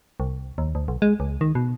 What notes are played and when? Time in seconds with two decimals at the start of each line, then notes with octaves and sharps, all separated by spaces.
0.20 C2
0.58 D#2
0.75 D2
0.88 B1
1.02 G#3
1.20 C#2
1.41 D#3
1.55 B2